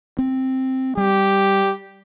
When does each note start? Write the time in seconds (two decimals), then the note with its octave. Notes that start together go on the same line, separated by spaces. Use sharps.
0.18 C4
0.97 G3 G4